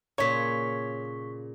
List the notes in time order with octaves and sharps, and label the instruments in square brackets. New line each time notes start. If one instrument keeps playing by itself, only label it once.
[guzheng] A#2 C#3 [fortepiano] C#5 [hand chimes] C#6 B6